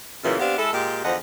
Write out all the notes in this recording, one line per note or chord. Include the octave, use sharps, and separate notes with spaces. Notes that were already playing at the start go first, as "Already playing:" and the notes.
F#2 A#2 C#3 E3
B3 C4 D4 G4 F5
G#3 E4 A4
A#2 G#3 G4
E2 D3 F3 D#5 F#5